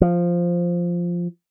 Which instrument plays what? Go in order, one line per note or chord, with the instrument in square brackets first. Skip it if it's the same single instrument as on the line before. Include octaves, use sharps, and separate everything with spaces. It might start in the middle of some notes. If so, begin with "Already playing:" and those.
[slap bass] F3